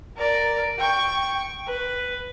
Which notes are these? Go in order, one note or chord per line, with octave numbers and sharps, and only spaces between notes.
A#4 D5
G5 C#6
B4